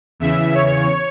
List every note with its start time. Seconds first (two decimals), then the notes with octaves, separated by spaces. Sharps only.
0.20 E2 C#3 E3 E5
0.54 C#5